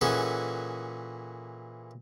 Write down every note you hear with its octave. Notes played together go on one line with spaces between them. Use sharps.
A#2 E3 C#4 F#4 G#4 A4